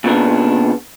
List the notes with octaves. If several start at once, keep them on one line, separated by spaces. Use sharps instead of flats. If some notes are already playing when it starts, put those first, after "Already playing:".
A#2 C#3 B3 D4